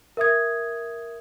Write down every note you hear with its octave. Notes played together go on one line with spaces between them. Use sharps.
A#4 E5 D#6 G#6